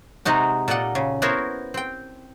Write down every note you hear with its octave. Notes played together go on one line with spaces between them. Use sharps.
C3 G#3 D#4 F#4
A#2 A4 D5 D#5 F#5
C#3
B3 E4 F#4 A#4 C5 C#5
C4 G5